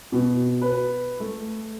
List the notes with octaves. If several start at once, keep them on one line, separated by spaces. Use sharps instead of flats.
B2
B4
A3